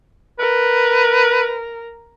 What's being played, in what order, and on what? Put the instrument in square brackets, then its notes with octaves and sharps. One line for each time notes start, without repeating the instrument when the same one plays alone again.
[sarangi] A#4 [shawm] B4